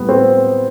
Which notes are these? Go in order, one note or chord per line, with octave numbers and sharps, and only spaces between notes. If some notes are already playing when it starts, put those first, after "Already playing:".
Already playing: A2 G3 B3
C4